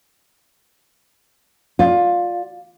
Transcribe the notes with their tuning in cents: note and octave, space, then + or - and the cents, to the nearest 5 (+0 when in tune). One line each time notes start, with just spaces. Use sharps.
F4 +15 D5 +0